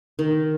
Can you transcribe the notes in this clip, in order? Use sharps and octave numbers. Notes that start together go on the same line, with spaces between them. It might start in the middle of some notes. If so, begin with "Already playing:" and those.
D#3